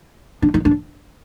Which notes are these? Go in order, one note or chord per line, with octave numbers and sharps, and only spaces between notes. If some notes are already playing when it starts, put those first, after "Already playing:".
D4
D#4
D4